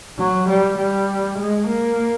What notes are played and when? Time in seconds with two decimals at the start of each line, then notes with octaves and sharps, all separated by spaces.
0.19 F#3
0.49 G3
0.78 G3
1.38 G#3
1.68 A#3